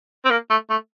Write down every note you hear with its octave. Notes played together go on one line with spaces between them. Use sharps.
C4
A#3
A3
A3